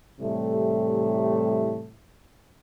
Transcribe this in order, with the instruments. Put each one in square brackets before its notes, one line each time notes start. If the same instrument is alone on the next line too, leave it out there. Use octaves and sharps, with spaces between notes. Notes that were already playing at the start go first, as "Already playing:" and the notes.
[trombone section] A2 C3 E3 G3 A3